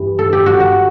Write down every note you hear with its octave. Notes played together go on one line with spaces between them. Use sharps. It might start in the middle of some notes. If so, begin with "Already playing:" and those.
Already playing: G2 E3 G4
A4
G4
F#4
F#4